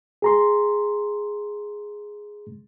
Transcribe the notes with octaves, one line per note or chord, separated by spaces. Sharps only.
G#4 A#5 C6